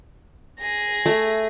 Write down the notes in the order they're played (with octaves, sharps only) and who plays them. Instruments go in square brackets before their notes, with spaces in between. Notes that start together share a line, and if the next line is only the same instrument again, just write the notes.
[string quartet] G#4 A#6
[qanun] A3